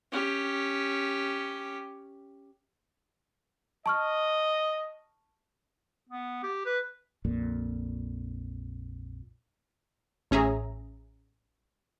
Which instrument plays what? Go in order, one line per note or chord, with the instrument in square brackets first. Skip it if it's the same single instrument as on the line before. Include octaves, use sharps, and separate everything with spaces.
[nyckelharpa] C#4 G4
[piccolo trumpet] D#5 [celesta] A5 C#6 F6
[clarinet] B3
G4
B4
[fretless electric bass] A#1 F2 A#2
[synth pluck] A1 C#4 G#4 E5 A#5